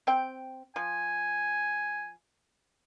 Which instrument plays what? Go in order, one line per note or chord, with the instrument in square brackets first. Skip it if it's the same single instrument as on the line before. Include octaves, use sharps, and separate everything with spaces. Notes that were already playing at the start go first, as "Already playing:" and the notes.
[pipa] C4 G5
[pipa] F3 [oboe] G#5